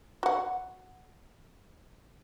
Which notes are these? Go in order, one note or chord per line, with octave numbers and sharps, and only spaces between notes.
F#4 F#5